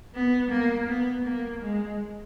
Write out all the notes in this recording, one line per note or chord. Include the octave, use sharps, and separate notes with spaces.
B3
A#3
B3
A#3
G#3